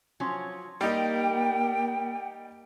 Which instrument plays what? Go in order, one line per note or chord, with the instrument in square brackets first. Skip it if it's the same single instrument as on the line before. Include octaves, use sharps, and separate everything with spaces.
[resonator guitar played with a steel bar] F3 F#3 C#4
[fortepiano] G3 D#4 [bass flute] A#3 [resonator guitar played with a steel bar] G4 [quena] G5